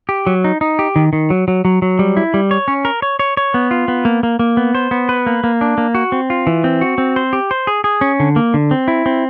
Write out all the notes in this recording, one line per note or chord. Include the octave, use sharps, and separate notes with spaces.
G4
F#3
D#4
D#4
G4
D#3
D#3
F#3
F#3
F#3
F#3
G3
E4
G3
C#5
C#4
A#4
C#5
C#5
C#5
B3
F4
B3
A#3
A#3
A#3
B3
C5
B3
B4
A#3
A#3
D4
A#3
F#4
C4
F4
E3
C4
F#4
C4
C5
G4
C5
G#4
G#4
C#4
D3
A#3
D3
C4
E4
C4